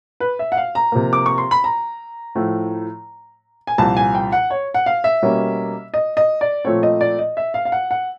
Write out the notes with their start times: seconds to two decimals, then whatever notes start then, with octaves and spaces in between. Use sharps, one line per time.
0.20 B4
0.39 E5
0.52 F#5
0.57 F5
0.75 A#5
0.92 C3 F3 A#3
1.13 D6
1.26 C#6
1.38 C6
1.51 B5
1.64 A#5
2.35 A2 F3 A3
3.67 G#5
3.78 C2 A#2 F3 A5
3.97 G#5
4.15 G5
4.32 F#5
4.50 C#5
4.74 F#5
4.86 F5
5.04 E5
5.22 B2 G3 A#3 C#4
5.94 D#5
6.17 D#5
6.41 D5
6.65 A#2 F3 A3 C4 C#5
6.83 D#5
7.01 D5
7.19 D#5
7.37 E5
7.54 F5
7.65 F5
7.72 F#5
7.91 F#5